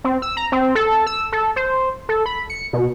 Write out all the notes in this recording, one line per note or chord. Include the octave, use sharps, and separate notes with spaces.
C4
E6
A#5
C4
A4
E6
A4
C5
A4
B5
C#7
B2